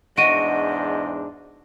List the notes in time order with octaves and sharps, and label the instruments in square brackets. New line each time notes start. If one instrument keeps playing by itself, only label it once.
[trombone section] E2 G#2 D4 [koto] F#4 [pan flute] D#5 [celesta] D7 D#7